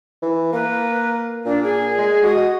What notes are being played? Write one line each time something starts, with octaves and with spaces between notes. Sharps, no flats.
E3
A#3 B4
A#2 D4
G#4
G#3
F#4 D#5